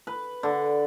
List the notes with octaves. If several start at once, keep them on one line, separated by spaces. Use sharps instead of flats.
B4
D3